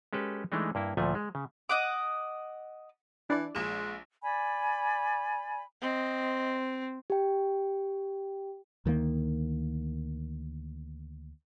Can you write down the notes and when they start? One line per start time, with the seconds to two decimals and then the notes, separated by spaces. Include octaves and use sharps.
0.13 G#3 C#4 G4 A4 B4
0.52 E3 G#3 A3 D4 D#4
0.75 G2 A#3 E4
0.97 D2 A#2 F3 A3 G#5
1.15 G#3
1.35 C#3
1.69 D#5 F#5 D6
3.30 E3 D4 E4 D5
3.55 A#1 G#3 E7
4.22 D5 G#5 B5
5.82 C4 D#5
7.10 G4 G5
8.86 D2 D#3 F3 A#3